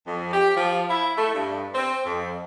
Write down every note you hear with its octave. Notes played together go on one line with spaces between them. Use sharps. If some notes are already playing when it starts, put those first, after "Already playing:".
F2
G4
F3
E4
A3
G2
C4
F2